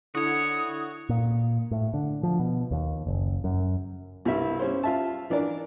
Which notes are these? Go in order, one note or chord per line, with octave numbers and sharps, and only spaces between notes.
D3 E4 F#4 C#5 D#6
A#2
A2
D3
F3
B2
D#2
F#1
F#2
C2 G2 E5
G3 C#4 C5
F4 E5 A5
E3 D4 A#4 D5